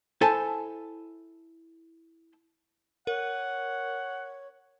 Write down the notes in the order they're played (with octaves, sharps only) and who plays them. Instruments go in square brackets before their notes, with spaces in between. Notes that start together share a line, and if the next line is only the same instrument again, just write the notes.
[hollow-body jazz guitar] E4 A4 C5 G#5 A5
[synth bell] A#4 [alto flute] C#5 [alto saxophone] F#5